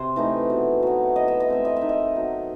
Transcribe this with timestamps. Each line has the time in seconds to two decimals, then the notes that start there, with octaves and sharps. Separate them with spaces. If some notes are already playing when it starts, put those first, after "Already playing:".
Already playing: C3 C5
0.16 E3 A3 D#4
0.50 B2
0.83 F#3 B3
1.15 E3 D#5
1.28 E5
1.40 D#5
1.48 A3 C4 E5
1.65 D#5
1.76 E5
1.81 D#3
1.89 D#5
2.15 F#3 B3 D#4